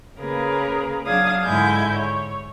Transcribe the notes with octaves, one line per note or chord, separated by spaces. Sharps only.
C#3 A#3 G#4 A#4 B4
F#3 D4 F5 D#6 G#6
G#2 D3 E4 G#5 G6
C#5